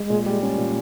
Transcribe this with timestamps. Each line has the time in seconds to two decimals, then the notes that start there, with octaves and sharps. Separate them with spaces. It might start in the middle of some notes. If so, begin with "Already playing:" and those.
Already playing: G#3
0.10 A#2
0.26 G3
0.42 C#4
0.58 A#2